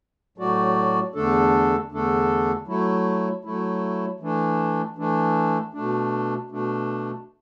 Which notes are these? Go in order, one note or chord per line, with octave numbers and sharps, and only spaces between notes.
A2 F#3 A3 F#4 D5
E2 D3 A3 D4 A4
E2 D3 A3 D4 A4
F#3 A3 E4
F#3 A3 E4
E3 A3 D4
E3 A3 D4
B2 A3 D4
B2 A3 D4